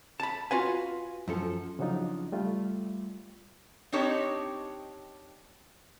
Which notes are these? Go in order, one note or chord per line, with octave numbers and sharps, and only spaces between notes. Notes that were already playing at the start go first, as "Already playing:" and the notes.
A5 B5
F4 F#4 B4 F5 G#5
F#2 F3 A4
C#3 F3 F#3 D4 D#4 F4
G3 A3 F4
C4 D4 D#4 G4 C#5 A5